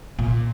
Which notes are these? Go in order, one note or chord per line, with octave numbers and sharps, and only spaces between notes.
A#2